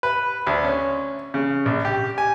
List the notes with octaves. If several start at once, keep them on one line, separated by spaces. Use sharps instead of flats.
B4
D2
C#4
C#3
A#1
G4
G#5